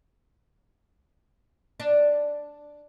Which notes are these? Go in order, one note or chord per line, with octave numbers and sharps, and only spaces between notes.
D4